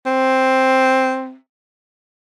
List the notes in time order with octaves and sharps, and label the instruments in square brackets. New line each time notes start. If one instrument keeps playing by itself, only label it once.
[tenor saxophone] C4